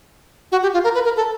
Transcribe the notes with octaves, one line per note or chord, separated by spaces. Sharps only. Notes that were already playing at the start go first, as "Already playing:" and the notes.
F#4
G4
F4
A#4
B4
A#4
A4